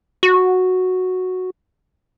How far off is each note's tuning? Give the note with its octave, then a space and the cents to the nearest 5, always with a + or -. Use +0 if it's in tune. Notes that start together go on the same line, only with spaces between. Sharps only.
F#4 -5